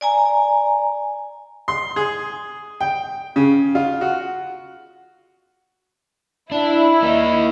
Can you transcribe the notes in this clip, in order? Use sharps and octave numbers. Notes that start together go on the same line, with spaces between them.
D5 G#5 A#5
C6
G#4
G5
C#3
F4
F#4
D4 E4
A#3 D#4